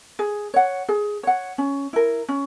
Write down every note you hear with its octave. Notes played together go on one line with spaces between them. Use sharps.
G#4
C#5 F#5
G#4
C#5 F#5
C#4
E4 A#4
C#4